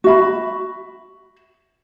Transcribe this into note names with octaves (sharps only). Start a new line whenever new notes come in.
F#4 E5 B5